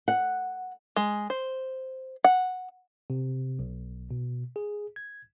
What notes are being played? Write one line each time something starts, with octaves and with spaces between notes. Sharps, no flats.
F#5
G#3
C5
F#5
C3
B1
B2
G#4
G#6